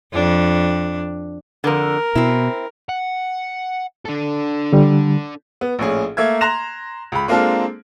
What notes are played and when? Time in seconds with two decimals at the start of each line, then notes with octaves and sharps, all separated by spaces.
0.13 F2 D4
1.64 F2 D3 A#4
2.15 B2 C4 E4
2.89 F#5
4.05 D4 A4
4.73 D3 G3
5.61 B3
5.79 A#1 A2 C#4 G#4
6.17 A3 A#3 E5 G#6
6.41 A#5 C6 F#6 A#6 E7 F7
7.12 C#2 B5
7.28 G#3 A#3 C4 D4 F4 A4